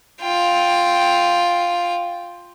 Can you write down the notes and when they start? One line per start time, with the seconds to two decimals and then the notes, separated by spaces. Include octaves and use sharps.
0.20 F4 G5